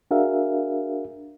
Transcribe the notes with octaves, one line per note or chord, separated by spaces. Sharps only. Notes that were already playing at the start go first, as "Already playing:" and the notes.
D4 F#4 G#4 A#4 E5 F5